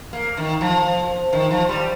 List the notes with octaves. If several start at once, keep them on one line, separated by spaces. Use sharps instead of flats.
A#3
D#3
F3
D#3
F3
G3